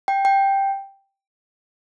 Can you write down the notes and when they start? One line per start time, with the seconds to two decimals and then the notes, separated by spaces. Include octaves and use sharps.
0.08 G5
0.25 G5